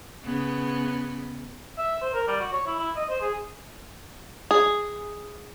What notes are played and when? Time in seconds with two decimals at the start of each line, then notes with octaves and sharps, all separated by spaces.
0.24 C#3 B3
1.78 E5
2.02 C5
2.14 A#4
2.28 G3
2.40 F#4
2.53 C#5
2.67 E4
2.79 E4
2.96 D#5
3.10 C5
3.21 G#4
4.51 G#4